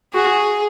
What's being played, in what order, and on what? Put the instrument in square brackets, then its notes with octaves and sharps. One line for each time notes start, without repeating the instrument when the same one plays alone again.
[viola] F#4 [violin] G#4